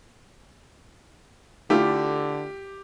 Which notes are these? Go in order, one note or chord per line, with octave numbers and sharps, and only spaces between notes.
D3 A3 E4 F4 G4